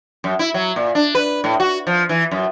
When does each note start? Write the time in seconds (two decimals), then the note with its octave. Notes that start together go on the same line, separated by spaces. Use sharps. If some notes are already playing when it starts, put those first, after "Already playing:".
0.24 F#2
0.39 E4
0.54 F#3
0.76 A#2
0.95 D4
1.15 B4
1.44 A2
1.60 F#4
1.87 F3
2.09 E3
2.31 F#2